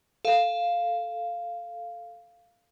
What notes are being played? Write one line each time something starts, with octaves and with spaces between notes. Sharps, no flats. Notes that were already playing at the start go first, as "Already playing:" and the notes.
A4 F5